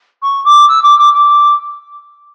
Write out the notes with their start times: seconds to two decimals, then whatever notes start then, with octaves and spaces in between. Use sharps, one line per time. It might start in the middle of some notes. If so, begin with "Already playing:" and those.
0.23 C#6
0.45 D6
0.69 E6
0.83 D6
0.98 D6
1.13 D6